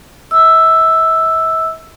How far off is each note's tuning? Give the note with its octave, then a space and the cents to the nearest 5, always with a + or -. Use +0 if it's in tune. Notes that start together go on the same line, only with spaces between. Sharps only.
E5 -40 E6 +0